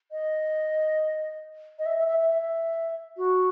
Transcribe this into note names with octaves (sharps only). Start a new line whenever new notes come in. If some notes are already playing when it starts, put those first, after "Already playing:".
D#5
D#5
E5
E5
E5
E5
E5
F#4